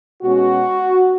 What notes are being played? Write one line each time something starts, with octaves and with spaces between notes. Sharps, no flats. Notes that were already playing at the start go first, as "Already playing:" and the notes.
B2 G#3 C#4 F#4